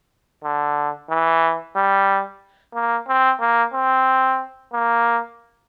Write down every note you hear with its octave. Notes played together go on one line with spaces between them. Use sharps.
D3
E3
G3
A#3
C4
A#3
C4
A#3